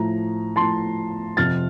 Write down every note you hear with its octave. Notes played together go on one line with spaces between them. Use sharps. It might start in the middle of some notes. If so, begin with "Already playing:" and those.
Already playing: A2 F3 A#5
A2 F3 A5 C6
F2 C3 F3 F6 A6